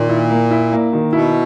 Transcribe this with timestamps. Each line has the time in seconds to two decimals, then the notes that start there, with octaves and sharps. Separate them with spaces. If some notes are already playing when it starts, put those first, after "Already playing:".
Already playing: A#2 D#3
0.09 E4
0.31 A#3
0.51 E4
0.72 A#3
0.93 D#3
1.13 B2 E4